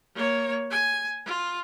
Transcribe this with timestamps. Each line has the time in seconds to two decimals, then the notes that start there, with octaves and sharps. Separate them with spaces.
0.15 A#3 C#5
0.71 G#5
1.26 F4